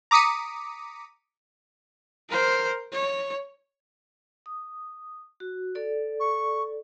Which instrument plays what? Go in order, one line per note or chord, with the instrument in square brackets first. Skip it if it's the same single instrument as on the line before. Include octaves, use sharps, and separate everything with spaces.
[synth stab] A#5 D6 D#6 B6 C#7 D#7
[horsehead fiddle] A#4 C5
C#5
[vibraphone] D#6
F#4
A4 D5
[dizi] C#6